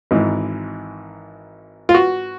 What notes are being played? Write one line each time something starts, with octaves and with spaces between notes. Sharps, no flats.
G#1 G#2 E3
F4
F#4